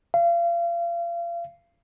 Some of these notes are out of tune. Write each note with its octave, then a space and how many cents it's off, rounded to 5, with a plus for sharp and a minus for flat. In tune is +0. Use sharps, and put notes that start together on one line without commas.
F5 -35